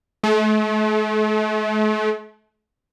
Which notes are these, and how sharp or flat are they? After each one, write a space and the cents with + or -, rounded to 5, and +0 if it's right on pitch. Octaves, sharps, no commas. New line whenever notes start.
A3 -45